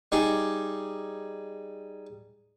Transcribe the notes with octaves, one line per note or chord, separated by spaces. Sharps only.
G3 D#4 G#4